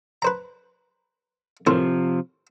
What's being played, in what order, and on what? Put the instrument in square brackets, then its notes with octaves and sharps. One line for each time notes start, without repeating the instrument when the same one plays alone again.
[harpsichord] B4 C5 A#5
[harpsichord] D#2 A2 C5 [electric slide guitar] C3 F3